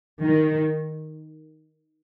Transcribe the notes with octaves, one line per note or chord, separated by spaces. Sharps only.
D#3